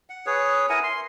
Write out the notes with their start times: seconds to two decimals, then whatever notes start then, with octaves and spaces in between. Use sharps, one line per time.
0.09 F#5
0.26 G#4 B4 C#5
0.69 E4 A#4 F#5 G#5
0.83 C6